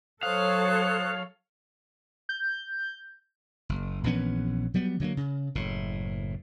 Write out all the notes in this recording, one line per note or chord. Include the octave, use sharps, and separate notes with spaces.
F#3 A4 C5 C#5 F5 D#6 F#6
G6
F#1
A#1 E3 B3 C#4
F#3 G3 B3
D3 F#3 A3 A#3
C#3
F#1 A2